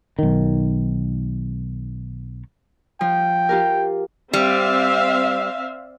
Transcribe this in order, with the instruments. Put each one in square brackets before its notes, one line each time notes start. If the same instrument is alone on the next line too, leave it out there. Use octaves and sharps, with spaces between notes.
[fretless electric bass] B1 D#3
[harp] F3 [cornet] G5
[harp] F4 G4 A#4
[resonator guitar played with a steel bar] G3 [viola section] C4 E5 F5